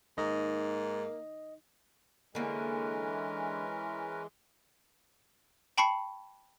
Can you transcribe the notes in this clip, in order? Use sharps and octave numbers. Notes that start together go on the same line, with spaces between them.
G#2 A#3 D#4 D#5
D3 E3 G#3 A#3 C#4 A#4 B4
G5 A5 B5 C#6 C7 C#7